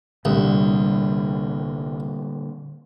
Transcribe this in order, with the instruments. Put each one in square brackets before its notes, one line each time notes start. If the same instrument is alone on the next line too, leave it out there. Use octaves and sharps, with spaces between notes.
[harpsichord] C2 [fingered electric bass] A#2 D3 G3